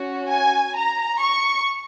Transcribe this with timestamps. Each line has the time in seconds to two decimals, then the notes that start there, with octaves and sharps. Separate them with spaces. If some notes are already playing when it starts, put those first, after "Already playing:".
Already playing: C#4 F#4
0.29 G#5
0.75 A#5
1.21 C#6